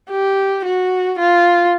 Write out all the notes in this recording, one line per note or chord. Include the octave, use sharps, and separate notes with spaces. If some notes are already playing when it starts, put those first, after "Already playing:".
G4
F#4
F4